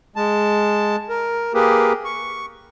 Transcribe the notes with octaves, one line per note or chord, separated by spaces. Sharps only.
G#3 A5
A#4
A#3 G4 G#4 A#4 B4
C#6